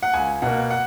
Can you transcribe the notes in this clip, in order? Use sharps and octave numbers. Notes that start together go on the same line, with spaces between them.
F#5
C#2 G#5
B2 A#3 F#5
F#5